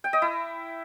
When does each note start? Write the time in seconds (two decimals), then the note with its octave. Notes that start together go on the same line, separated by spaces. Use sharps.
0.04 G5
0.13 D#5
0.22 E4